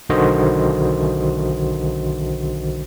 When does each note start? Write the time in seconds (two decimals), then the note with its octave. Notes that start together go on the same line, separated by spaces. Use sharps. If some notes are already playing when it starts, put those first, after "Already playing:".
0.09 B1 D3 D#3 F#4 C5 D#5